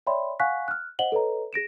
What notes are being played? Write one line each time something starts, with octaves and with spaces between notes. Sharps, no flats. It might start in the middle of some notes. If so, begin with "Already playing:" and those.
C#5 D5 E5 G5 B5 C6
F5 F#5 G#5 C#6 F#6 B6
F6 F#6
C5 D#5 F5 F#5 F#7 G7
A4 B4 C#5 D#5 A#5
G#4 A#6 D7 E7